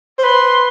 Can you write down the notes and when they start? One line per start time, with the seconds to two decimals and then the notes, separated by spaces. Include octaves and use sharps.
0.19 C5
0.24 B4 C6